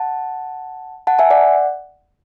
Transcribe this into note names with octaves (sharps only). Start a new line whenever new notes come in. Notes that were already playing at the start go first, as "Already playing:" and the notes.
Already playing: F#5 A5
F#5 A5
E5 G#5
D5 F#5